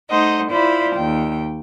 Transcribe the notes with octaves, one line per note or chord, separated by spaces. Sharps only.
A3 D#4 C5 D#5 F#5
E4 F4 C5 D5 B5
D#2 G5